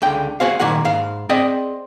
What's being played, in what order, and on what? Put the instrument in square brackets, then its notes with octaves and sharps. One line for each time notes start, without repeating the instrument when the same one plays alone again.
[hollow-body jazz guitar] C#2 D3 G5
F#4 G#4 C5 F5
A#2 D#3 A#3 G#4 F#5
G#2 F5
C4 G#4 D5 D#5 G5